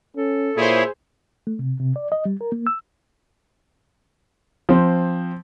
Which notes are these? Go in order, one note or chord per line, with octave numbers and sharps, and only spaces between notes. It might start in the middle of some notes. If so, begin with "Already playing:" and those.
C#4 A4
A#2 E4 G#4 C5 C#5
A3
C3
C3
D5
D#5
G3
A#4
A#3
E6
F3 C4